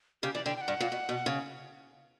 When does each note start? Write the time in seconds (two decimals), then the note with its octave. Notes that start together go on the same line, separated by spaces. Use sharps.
0.22 C#3 G4
0.34 E3 D5
0.45 D3 G5
0.57 G5
0.61 F#5
0.68 G2
0.80 A#2
0.92 B2
1.09 B2
1.26 C#3